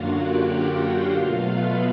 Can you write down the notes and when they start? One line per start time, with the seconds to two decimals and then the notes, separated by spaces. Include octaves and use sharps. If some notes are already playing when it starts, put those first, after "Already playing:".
Already playing: F#2 D3 F#3 A#3 F4 F#4 F5 F#5
0.19 G4 G5
0.66 F#4 F#5
1.13 B2 F#3 A3 F4 F5
1.44 B3 B4